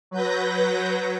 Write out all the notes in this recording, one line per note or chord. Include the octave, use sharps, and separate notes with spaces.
F#3 B4 G6 A#6